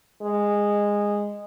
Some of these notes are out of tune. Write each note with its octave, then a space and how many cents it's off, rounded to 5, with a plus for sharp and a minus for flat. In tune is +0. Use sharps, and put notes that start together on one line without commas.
G#3 -15